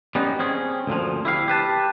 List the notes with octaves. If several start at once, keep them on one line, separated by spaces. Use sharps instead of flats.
G3 B3 C#4 D#4
C4 C#4 G#4
D2 A#2 F3
E4 G4 F5
G4 B4 A5